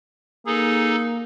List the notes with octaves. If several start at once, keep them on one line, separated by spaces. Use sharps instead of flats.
A#3 D#4 G#4 A4